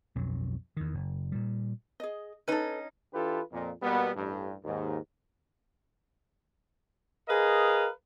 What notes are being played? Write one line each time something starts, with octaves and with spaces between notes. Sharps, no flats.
B1 F2 F#3
E2 D#3
F#1
A#2 G3
G#4 D#5
C#4 D#4 A4 B4
E3 D4 F4 G4 A4 B4
F2 A#2
B2 G3 A#3 B3
A1 G2
D#2 G#2
G#4 A#4 B4 D#5 F5